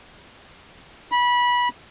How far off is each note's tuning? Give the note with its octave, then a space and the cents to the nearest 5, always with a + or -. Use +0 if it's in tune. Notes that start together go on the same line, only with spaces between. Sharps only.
B5 -20